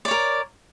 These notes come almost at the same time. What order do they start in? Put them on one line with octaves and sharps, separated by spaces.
D5 C#5 A#4